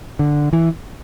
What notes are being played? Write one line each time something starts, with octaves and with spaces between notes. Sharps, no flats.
D3
E3